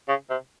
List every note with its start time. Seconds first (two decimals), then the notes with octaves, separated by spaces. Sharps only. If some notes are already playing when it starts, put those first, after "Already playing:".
0.09 C#3
0.30 C3